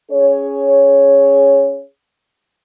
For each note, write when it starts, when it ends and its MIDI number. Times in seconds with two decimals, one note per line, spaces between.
0.11 1.83 61
0.11 1.83 68
0.11 1.83 73